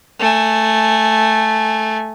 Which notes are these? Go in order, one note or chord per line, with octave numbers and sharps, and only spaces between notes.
A3 G#5